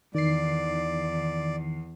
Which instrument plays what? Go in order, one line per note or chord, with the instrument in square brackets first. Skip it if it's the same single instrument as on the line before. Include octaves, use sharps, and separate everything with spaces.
[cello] E2 [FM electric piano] D#3 C7 [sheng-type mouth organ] D5